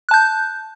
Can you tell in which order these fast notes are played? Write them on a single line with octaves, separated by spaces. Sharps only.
F#6 A5 G6